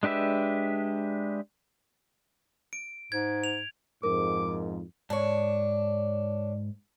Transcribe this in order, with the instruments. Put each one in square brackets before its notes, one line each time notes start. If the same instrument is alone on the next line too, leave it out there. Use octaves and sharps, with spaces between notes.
[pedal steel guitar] G#3 D4 G4 B4 E5
[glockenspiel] D7
[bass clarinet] G#2 [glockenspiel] G#6
[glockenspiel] F7
[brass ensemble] F2 G#2 [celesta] A#4 [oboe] D6
[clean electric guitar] G#2 A5 [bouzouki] D4 C#5